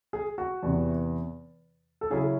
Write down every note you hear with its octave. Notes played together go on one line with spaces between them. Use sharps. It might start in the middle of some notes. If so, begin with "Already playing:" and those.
G#4
F#4
E2 C3 E3
A4
C#3 F#3 C#4 E4 G#4